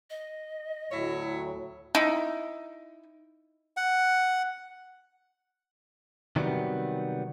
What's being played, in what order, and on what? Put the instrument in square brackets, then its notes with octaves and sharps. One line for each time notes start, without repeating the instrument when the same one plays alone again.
[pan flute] D#5
[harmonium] D2 A2 F#3 [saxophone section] E4 C#5
[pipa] D#4 E4
[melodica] F#5
[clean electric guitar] C3 D#3 F#3 G3 B3